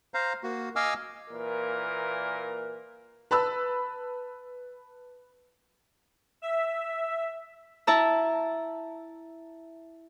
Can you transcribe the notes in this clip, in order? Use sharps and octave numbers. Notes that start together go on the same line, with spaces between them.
C5 F5 A#5
A#3 F#4
D#5 F5 G#5 D6 E6 F6
A#2 E3 A#3 A#4
B4 A5 B5 E6
E5
E4 E5 A5 A#5 E6